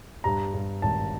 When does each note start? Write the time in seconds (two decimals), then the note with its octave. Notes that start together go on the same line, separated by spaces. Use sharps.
0.24 G2 A#5
0.54 G2
0.82 G#1 A5